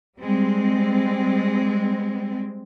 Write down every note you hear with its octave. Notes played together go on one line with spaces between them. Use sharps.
G3 G#3 C4